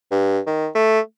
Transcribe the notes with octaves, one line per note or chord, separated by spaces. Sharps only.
G2
D#3
A3